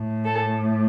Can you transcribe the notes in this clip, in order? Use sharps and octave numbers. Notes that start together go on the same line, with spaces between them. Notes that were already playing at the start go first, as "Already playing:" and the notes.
Already playing: A2 A3
A4